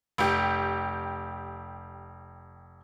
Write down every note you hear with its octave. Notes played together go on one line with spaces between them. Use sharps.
F1 G4